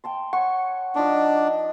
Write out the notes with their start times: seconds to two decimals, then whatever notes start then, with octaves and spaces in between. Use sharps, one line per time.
0.04 G5 A5 C6
0.33 C#5 F#5 C#6
0.95 F3 D4 D#4 D6